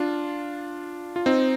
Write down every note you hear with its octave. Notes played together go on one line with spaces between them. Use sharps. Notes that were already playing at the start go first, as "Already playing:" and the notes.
Already playing: D4 F4
F4
C4 D#4